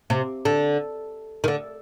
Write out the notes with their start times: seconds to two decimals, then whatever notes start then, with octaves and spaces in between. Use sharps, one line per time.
0.10 C3
0.45 D3
1.44 D#3
1.48 D3